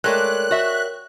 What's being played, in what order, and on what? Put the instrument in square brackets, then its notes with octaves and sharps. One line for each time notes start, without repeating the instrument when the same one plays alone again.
[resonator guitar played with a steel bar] G#3 A3 D5 [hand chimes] A#4 C#5 G5 [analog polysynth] F#6
[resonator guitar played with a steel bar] F#4 E5